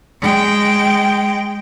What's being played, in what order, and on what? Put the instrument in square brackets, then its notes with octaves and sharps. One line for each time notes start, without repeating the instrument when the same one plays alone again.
[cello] G#3 G5